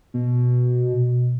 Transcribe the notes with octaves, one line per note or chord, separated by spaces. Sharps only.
B2